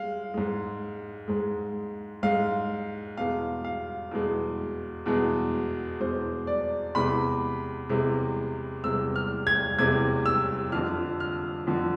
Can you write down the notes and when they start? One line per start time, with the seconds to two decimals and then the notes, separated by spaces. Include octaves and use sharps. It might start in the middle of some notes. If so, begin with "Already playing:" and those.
Already playing: G#3 F5
0.34 G#2 G#3
1.28 G#2 G#3
2.23 G#2 G#3 F5
3.17 E2 B2 G#3 F5
3.64 F5
4.11 E2 B2 G#3
5.06 E2 B2 G#3
6.00 E2 B2 G#3 C5
6.47 D5
6.95 E2 C3 G#3 B5
7.89 E2 C3 G#3
8.84 E2 C3 G#3 E6
9.16 F6
9.47 G#6
9.79 E2 C3 G#3 G#6
10.26 E6
10.72 F2 D3 F3 F6
11.20 F6
11.67 F2 D3 F3